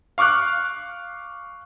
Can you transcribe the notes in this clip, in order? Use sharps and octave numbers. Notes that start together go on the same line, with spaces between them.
F5 C#6 D6 F6 F#6